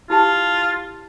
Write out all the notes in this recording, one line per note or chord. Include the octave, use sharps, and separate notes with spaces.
E4 F4 G4 A5